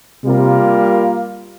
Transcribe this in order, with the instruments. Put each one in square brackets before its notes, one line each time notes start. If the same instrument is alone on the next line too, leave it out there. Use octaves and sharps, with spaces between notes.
[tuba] C3 [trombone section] G3 A#3 F4 A#4